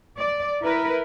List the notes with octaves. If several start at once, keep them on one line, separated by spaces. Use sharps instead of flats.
D5
E4 A#4 B4